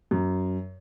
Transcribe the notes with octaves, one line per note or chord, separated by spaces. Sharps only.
F#2